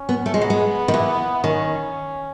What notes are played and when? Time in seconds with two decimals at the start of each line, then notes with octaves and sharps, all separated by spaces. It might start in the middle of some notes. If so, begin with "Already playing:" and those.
Already playing: C#4
0.09 B3
0.26 A3
0.34 G#3
0.42 F#3 B3
0.50 G#3
0.88 D#3
0.94 E3
1.44 D#3 C#4